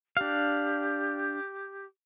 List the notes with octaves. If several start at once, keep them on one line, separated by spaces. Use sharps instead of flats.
D4 G4 F5